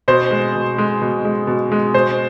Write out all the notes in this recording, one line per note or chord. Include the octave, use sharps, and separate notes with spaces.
B2 C5
G#3
B2
G#3
B2
G#3
B2
G#3
B2 C5